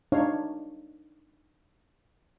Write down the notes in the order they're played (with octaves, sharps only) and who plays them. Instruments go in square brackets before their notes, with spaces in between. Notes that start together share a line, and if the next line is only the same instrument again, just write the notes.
[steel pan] D4 D#4 C#5 F5